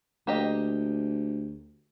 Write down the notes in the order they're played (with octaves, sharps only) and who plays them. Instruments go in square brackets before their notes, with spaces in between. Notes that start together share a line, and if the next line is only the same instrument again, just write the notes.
[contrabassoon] D2 [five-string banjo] A#3 G4 D#5